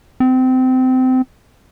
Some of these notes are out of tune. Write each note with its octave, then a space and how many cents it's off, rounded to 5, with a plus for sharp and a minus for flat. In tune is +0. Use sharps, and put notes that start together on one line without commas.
C4 -25